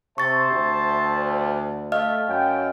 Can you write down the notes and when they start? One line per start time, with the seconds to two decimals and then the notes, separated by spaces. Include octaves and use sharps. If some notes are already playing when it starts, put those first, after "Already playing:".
0.18 C3 C5 E5 A5 C#6 A6
0.51 D2
1.92 A3 D#5 F5 F6
2.29 F#2 G5